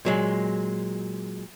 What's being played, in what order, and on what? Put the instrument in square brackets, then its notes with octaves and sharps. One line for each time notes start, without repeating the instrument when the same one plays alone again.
[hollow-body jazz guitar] A#2 F#3 G#3